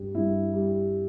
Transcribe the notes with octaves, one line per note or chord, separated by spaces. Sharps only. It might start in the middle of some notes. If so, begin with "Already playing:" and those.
Already playing: G2 G3
G2 E4
G3